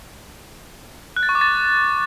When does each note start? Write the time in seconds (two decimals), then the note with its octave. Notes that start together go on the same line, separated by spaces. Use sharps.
1.16 F#6
1.23 A6
1.29 C#6
1.35 D6
1.41 A6